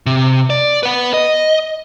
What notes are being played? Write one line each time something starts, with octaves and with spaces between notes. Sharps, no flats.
C3
D5
B4 F#5
D#5